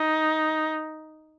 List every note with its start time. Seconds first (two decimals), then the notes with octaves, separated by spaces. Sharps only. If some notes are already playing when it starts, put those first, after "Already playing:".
Already playing: D#4